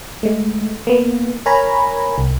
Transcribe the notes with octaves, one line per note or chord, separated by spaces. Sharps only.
G#3 A3
A#3 B3
A#4 C#5 G#5 A#5 B5
C2